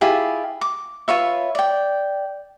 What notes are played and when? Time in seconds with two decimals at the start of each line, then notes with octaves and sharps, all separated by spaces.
0.01 E4 F4 G4 G#4
0.61 D6
1.08 F4 B4 C#5 E5
1.55 D5 G5